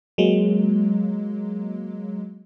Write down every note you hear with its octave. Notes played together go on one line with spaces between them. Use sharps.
F#3 G#3 A#3